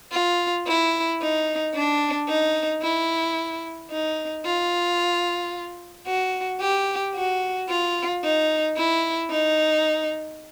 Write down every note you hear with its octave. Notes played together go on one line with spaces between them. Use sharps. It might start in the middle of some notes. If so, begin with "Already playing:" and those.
F4
E4
D#4
D4
D#4
E4
D#4
F4
F#4
G4
F#4
F4
D#4
E4
D#4